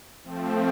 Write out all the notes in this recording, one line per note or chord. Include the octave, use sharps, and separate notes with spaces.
F3 A3 C4